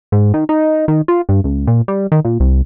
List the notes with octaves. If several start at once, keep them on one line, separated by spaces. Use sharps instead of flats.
G#2
D#3
D#4
D#3
F4
G2
C#2
A#2
G3
D#3
A#2
C2